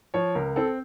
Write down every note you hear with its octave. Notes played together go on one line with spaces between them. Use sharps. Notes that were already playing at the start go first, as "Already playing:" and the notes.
F3 C#5
C#2 A#4
C4 A4